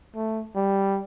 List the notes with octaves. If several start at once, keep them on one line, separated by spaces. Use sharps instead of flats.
A3
G3